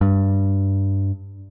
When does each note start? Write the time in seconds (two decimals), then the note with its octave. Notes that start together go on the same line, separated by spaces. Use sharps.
0.01 G2